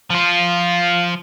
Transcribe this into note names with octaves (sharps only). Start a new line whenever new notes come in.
F3 F4